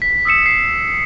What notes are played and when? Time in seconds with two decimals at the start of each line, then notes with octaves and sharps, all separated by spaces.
0.02 B6
0.25 D#6 E6 B6 C#7 E7
0.46 C7